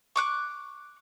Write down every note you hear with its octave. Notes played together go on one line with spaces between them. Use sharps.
C#6 D6 F#6